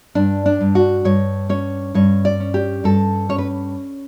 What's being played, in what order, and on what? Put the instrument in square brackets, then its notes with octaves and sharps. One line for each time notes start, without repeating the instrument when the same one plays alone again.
[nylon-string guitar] G2 D4
D4
G2
F#4
G2 C#5
C#4 C#5
G2 C#5
D5
C#4
G4
G2 A4
C#4 C#5
B4